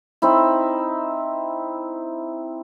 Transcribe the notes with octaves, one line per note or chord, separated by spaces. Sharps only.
C4 D#4 E4